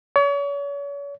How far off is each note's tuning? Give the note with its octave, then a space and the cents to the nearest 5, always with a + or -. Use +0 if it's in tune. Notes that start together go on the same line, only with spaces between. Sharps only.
C#5 +40